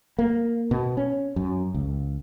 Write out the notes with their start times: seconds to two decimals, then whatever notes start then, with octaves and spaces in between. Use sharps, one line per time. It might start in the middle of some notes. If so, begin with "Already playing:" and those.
0.19 A#3
0.71 B2
0.97 C#4
1.36 F#2
1.74 C#2